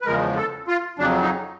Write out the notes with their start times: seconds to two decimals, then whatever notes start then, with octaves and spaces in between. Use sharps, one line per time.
0.01 B4
0.05 E2 C#3 F3 G#3 A#4
0.37 A4
0.68 F4
0.98 F2 C#3 F#3 D4
1.22 D#4